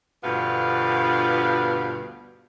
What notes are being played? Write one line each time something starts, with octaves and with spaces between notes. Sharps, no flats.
D2 G2 B2 B3 F4 F5